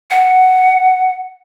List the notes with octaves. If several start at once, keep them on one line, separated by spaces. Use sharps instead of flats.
F#5